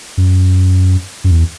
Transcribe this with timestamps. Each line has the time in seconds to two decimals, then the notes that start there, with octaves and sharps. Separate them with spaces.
0.17 F#2
1.24 F#2
1.31 E2